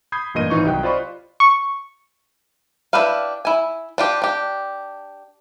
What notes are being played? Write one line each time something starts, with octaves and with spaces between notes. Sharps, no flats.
B5 D#6 G6 G#6 C7
A1 G2 A#2 D#5 D#7
G#1 E3 D#4 F4 C#6
C2 F#3 G4 D#5 G5 F#6
F4 C5 D5 D#5 B5 C#6
C#6
D4 E4 G4 B4 F5
E4 G#5
D4 F4 G4
D4 G4